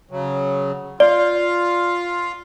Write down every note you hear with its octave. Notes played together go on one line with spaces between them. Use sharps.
C#3 F#3
F4 D5 F5